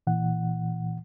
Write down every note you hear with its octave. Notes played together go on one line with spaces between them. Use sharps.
A#2 E3 F#5